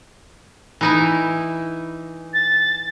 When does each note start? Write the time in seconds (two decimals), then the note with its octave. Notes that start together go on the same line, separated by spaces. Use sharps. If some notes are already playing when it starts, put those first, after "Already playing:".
0.81 E3 D#4 E4
2.34 A6